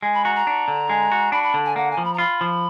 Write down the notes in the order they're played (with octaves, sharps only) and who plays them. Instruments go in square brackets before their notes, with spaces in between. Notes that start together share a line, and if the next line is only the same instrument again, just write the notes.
[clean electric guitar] G#3
[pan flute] B5
[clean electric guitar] F#4 [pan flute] A#5
[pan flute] A#5
[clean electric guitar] D4
D3
G#3
F#4
[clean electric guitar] D4 [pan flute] B5
[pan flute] B5
[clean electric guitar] D3
[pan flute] G#5
[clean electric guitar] A#3 [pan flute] F#5
[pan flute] G#5
[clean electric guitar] F3
[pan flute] B5
A#5
[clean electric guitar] F4 [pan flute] B5
[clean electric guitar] F3